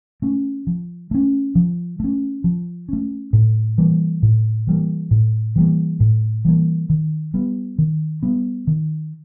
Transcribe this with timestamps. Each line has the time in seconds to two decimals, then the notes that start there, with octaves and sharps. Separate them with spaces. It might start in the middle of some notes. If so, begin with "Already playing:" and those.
0.22 A3 C#4
0.67 F3
1.11 A3 C#4
1.55 F3
2.00 A3 C#4
2.44 F3
2.89 A3 C#4
3.33 A2
3.78 E3 G3 A#3
4.23 A2
4.67 E3 G3 A#3
5.11 A2
5.56 E3 G3 A#3
6.00 A2
6.45 E3 G3 A#3
6.90 D#3
7.34 G3 B3
7.78 D#3
8.23 G3 B3
8.67 D#3